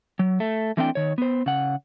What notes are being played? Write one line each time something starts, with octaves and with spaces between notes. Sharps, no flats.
F#3
A3
E3 A3 C4 D4 D5 G5
D#3 C#5
B3 C5
C#3 F#5